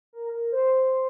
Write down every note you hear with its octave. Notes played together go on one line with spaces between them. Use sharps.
A#4
A#4
C5